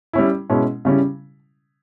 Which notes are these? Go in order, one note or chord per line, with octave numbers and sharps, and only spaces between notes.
G3 C#4 E4
B2 G#3 C#4 E4
C#3 G3 C#4 E4